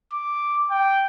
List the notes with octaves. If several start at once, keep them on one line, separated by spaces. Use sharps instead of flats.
D6
G5